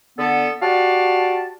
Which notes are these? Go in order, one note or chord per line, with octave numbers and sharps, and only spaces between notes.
D3 B3 A4
F#4 G4 D5 F5 A5